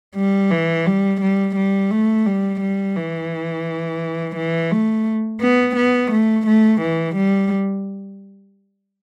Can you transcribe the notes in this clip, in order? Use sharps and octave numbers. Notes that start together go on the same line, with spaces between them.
G3
E3
G3
G3
G3
A3
G3
G3
E3
E3
A3
B3
B3
A3
A3
E3
G3